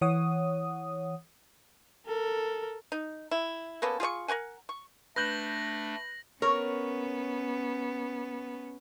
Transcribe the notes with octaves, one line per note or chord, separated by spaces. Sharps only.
E3 C#5 F#5 D#6
A4 A#4
D#4
E4
A#3 B3 C#4 A4
F4 G#4 D5 C#6
A#4 C#5 F#5 G#5
C#6
A3 D4 B4 F#6 G6 A#6 F#7
B3 C#4 A#4 C#5